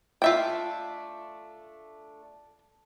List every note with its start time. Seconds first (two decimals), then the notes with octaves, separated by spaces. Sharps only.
0.22 A3 D4 F4 E5 G5